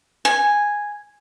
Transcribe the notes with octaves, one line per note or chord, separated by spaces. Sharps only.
G#5